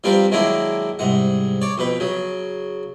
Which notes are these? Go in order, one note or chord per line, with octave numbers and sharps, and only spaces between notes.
F3 G3 C4 F4 A#4 B4
D#3 F#3 G#3 A#3 D4 E4
C2 G#2 F#5
C#5 D5
F2 B2 B4
C#3 F#3